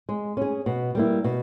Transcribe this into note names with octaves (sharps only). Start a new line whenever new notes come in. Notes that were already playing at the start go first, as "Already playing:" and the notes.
G#3
C#4 G#4
B2
G3 A#3 E4
B2